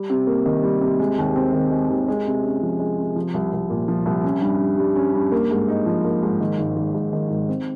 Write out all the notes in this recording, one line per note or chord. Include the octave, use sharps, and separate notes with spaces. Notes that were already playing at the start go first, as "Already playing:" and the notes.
Already playing: G3
C3
A#3
D#3
G3
C3
G#3
D#2
C4
D#3
G#3
D#2
G#3
C3
C#4
F3
G#3
C3
F3
C2
C2
A#2
F3
C2
C#4
G2
G2
G3
C#4
G2
A#3
G#2
D#4
F3
A#3
G#2
D#3
G#1
G#1
G#2
D#3
G#1
C4